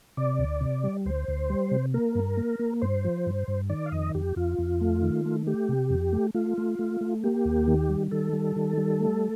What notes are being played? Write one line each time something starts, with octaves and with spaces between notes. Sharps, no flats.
C3 D5
D2
C3
G3
D2 C5
D2
G3
C3
A#3 A#4
G2
A#3
A#3
G2 C5
F3
G2
G2
D#3 D5
F5
F2 D#5
F2 G4
F2 F4
F2
A3
D#3
A3
A3 G4
C3
F2
A3
A3 F4
A3
A3
A3
A#3 G4
D#2
D#3
G3
D#3 A4
G3
D#3
G3
A3